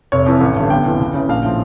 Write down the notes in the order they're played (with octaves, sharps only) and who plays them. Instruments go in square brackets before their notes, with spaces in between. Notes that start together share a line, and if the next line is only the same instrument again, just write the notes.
[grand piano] F1 C#5
F2 E3
A1
G2 D3
G1 G5
F2 E3
C#2
C#3 E3
A#1 F5
A2 F3